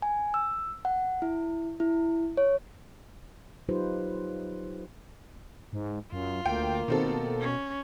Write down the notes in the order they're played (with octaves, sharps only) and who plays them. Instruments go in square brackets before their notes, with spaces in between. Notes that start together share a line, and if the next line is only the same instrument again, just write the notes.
[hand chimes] G#5
E6
F#5
E4
E4
C#5
[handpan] F#3 D#4 F4 G4 B4 C5
[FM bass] G#2
[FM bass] F#2 [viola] F4
[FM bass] D2 [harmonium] A#3 [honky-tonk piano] G5
[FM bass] B2 [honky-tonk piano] D#3 C4 A4
[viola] C#4